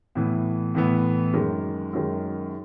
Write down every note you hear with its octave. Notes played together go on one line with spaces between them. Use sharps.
A2 E3 B3
A2 E3 B3
F#2 D#3 G#3
F#2 D#3 G#3